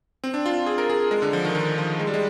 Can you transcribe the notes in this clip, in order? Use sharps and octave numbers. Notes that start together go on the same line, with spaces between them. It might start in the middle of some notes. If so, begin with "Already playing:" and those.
C4
D4
F4
G#4
A#4
G#4
G#3
D3
F3
D#3
D#3
F3
G#3
G3
G#3